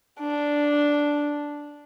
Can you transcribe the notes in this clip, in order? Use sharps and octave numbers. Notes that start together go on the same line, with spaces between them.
D4